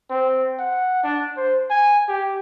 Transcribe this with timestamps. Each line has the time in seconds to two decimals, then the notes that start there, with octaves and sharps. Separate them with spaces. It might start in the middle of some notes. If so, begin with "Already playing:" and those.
0.10 C4
0.59 F#5
1.03 D4
1.36 C5
1.70 G#5
2.08 G4